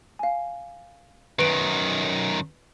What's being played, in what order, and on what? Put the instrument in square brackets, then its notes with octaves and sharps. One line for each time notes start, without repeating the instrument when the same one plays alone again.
[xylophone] F5 G#5
[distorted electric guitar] F#2 D#3 [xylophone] B4 D7